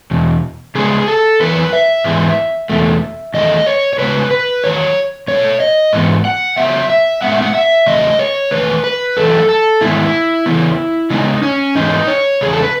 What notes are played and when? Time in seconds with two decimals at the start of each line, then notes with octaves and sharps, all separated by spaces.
0.11 E2 B2
0.75 C#3 G#3 B3 G#4
1.08 A4
1.40 F#2 E3 B3 B4
1.73 E5
2.04 G#2 E3 G#3 B3
2.70 E2 B2 A3
3.34 E2 D#3 A3 D#5
3.66 C#5
3.93 C#5
3.99 C#3 G#3 B3 B4
4.31 B4
4.64 E2 D#3 F#3 C#5
5.28 B2 A3 C#5
5.60 D#5
5.93 G#2 E3 B3
6.25 F#5
6.58 C#3 F#3 B3 E5
6.90 E5
7.22 A2 G#3 B3 F#5
7.32 E5
7.42 F#5
7.55 E5
7.86 E2 C#3 F#3 A3 D#5
8.19 C#5
8.51 E2 D#3 A3 B4
8.84 B4
9.17 F#2 E3 A3 A4
9.49 A4
9.81 G#2 D#3 G#3 B3 E4
10.46 C#3 E3 B3
11.10 C#3 G#3 B3 D#4
11.43 C#4
11.75 G#2 E3 G#3 B3 D#4
12.08 C#5
12.41 E2 C#3 G#4
12.53 A4
12.62 B4